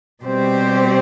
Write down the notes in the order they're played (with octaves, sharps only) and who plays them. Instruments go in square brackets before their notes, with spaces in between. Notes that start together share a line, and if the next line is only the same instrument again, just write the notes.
[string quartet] B2 G3 C4 G4 C5